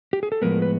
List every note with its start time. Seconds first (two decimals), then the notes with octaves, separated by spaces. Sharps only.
0.13 G4
0.23 G#4
0.32 A4
0.42 A2 F3 G#3 B3 A#4
0.62 B4